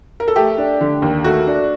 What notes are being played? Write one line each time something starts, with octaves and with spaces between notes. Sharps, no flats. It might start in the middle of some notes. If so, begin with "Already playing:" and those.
A#4
A4
A3 G4
D4
D3
D#2
A3 F#4
D4